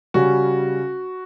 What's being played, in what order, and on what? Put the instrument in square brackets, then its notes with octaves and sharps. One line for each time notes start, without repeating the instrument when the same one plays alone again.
[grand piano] C#3 G3 C#4 F#4